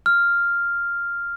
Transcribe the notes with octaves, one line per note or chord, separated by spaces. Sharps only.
F6